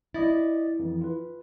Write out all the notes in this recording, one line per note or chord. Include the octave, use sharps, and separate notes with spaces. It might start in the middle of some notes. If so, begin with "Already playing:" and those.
E4 D5 D#5 A6
F2 E3
F4 B4